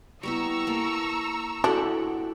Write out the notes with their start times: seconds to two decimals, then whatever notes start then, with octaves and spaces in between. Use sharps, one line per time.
0.23 G3 B3 E4 A#5 C#6 E6
0.67 A#3 A4
1.64 D4 E4 F#4 G4 A4 F#5